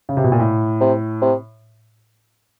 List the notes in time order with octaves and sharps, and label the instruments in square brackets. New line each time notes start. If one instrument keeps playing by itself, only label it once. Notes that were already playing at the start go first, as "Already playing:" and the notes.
[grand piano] C#3
C3
B2
A#2
A2
[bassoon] C3
C3